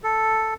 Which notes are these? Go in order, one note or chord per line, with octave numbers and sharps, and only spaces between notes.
A4